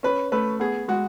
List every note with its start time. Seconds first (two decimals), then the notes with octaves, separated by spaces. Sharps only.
0.03 C#4 B4
0.32 A3 B4
0.60 B3 G#4
0.88 G#3 F#4